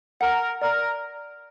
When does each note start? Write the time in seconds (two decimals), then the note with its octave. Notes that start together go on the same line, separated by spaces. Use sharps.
0.21 A#4 F#5
0.62 A#4 D5